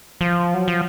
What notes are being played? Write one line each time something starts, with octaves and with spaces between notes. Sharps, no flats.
F3
F#3
F3